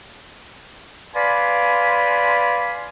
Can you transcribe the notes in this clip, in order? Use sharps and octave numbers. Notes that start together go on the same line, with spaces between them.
B4 D5 F5 G#5 B5 C6